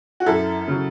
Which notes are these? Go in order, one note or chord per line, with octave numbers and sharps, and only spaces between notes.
F#4
F#2 E4 A4
C#3 F#3